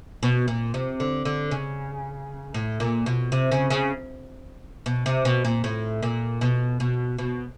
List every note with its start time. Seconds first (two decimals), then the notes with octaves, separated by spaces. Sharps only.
0.23 B2
0.48 A#2
0.74 C3
1.00 D3
1.25 D3
1.51 C#3
2.54 A2
2.80 A#2
3.06 B2
3.32 C3
3.52 C#3
3.70 C#3
4.86 B2
5.06 C3
5.25 B2
5.45 A#2
5.64 A2
6.03 A#2
6.41 B2
6.80 B2
7.19 B2